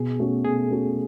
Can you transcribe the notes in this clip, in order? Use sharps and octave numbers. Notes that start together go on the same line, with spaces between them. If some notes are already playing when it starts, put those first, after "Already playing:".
Already playing: B2 G#4
A3 C#4 F#4 A4
B2 G#4
A3 C#4 F#4 A4